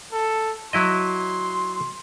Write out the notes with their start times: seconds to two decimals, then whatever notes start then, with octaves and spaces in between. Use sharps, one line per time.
0.12 A4
0.73 F#3 E4 D#5 C6